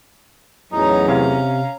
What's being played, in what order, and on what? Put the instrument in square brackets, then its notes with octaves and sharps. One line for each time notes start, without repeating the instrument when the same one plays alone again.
[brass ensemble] E2 A2 F#3 [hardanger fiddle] C#4 A#5 [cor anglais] D#4
[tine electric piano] C3 [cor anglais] F5